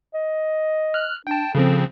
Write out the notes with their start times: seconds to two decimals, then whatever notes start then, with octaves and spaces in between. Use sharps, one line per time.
0.14 D#5
0.94 F6 F#6
1.27 D4 G5 A5
1.55 C#3 F3 C4 A4